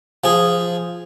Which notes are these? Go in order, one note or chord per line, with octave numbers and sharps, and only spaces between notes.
F3 G#4